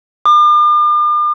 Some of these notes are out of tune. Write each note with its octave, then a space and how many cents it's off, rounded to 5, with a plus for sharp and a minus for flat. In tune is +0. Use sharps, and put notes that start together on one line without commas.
D6 +45